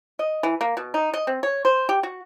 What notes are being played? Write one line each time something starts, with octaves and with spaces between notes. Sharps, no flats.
D#5
E3
A#3
B2
D#4
D#5
C4
C#5
C5
G4
F#4